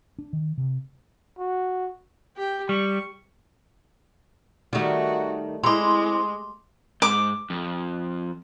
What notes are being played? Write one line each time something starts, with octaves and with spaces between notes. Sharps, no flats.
D4
D#3
C3
F#4
G4 G5
G3 C#6
D#3 G3 A3 D#4 F#4
G#3 C4 E4 C6 D6
G#2 D6
F2